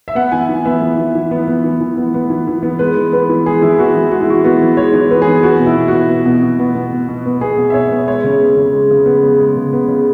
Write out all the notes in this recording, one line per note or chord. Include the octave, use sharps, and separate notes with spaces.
E5
B3 F#5
E3 G#5
E3
B3 E5
B3
E3
E3
B3
B3
E3
E3
B3
B3
E3
E3
B3
G#3 B4
E3
B3 B4
E3
G#3 G#4
E3 E4
B3 F#4
E3
G#3 F#4
E4
E3 F#4
B3 F#4
E3
G#3 C#5
E3
B3 B4
G#4
E3
B3 F#4
B2
E4
B2
B3 F#4
B3
B2
B2
B3
B3
B2
B2
B3
B3 G#4
B2
E5
B2 C#5
B3
G#3 C#5
C#3
B3
C#3
G#3
C#3
B3
C#3
G#3
C#3
B3
C#3